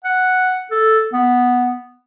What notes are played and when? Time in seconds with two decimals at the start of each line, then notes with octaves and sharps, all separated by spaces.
0.04 F#5
0.71 A4
1.13 B3